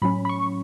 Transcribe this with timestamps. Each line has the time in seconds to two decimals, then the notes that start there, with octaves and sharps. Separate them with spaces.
0.02 A2 F#3 C#4 B5
0.25 B5
0.29 C#6